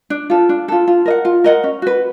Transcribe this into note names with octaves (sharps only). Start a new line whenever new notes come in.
D4
F4 A4
D4
F4 A4
F4
A#4 D#5 F#5
F4
A#4 D#5 F#5
C#4
F#4 B4